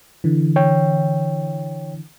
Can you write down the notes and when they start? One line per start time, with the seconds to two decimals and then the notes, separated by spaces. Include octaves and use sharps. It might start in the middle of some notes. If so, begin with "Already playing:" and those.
0.24 D3 E3
0.56 C#5 G5